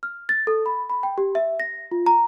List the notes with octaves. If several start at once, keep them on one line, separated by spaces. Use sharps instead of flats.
F6
A6
A4
B5
B5
G5
G4
E5
A#6
F4
A#5